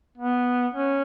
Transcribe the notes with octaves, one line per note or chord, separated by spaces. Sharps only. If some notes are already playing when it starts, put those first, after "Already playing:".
B3
C#4